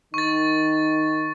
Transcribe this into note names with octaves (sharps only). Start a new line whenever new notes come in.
D#3 D#4 C#6 A6